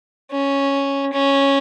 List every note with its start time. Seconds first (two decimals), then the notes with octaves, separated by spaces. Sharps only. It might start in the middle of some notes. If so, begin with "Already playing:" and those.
0.31 C#4
1.13 C#4